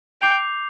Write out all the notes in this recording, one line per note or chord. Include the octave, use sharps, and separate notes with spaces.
G5 D6 G6 C7 F7